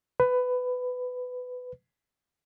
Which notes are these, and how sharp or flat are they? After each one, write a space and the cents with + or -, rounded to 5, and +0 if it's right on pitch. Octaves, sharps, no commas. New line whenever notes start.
B4 +15